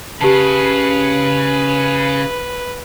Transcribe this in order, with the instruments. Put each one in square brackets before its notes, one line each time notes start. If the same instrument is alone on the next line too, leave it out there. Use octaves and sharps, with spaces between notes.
[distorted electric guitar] C#3 [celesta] G4 A5 [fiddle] B4